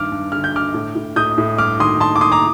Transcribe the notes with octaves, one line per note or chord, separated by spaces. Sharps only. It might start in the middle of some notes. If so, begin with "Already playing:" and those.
Already playing: G2 D#3 D6 F6
G2
D3 F6
G6
D3 D6 F6
A2
A2
A2 D#6 G6
A2
G2 D6 F6
D#3 C6 D#6
D#3 A5 C6
D6
D#3 C6 D#6
A#5 D6